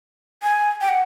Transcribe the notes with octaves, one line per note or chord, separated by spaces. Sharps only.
G#5
G5
F#5